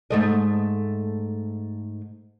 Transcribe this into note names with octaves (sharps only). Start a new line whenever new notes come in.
G#2 A3 D#5